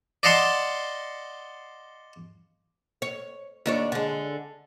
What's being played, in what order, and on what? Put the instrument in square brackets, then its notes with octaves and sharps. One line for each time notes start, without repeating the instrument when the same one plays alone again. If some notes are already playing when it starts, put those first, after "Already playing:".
[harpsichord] D5 D#5 F5 F#5 A5 C6
[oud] C#5
D#2 D4 C#5
D3 G#3